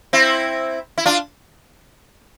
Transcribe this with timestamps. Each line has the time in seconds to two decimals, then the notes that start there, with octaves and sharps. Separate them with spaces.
0.13 C4 E4
0.98 E4
1.06 D4 F4